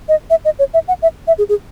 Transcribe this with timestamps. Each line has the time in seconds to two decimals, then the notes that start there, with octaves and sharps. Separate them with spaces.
0.09 D#5
0.30 E5
0.45 D#5
0.59 C#5
0.74 E5
0.88 F#5
1.02 E5
1.27 E5
1.38 G#4
1.49 G#4